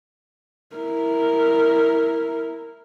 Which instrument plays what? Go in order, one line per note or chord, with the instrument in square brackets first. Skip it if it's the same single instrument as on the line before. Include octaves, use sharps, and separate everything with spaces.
[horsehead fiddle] E4 A#4